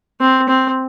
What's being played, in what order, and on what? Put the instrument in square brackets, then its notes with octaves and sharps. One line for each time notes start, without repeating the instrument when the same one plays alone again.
[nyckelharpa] C4
C4